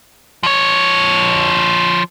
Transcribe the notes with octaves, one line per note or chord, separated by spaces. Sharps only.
F3 C#5